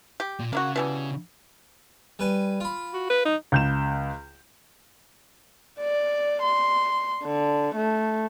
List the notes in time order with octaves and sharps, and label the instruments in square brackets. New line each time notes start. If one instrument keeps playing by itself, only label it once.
[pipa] G4
[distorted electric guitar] A#2
[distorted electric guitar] C#3 [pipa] A#3 E4 F#4
[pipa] B2 E3 G3
[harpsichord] G3 B4 G#5
F4 B5
[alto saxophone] F#4
B4
D#4
[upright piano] C#2 G6 E7
[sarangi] D5
C6
D3
A3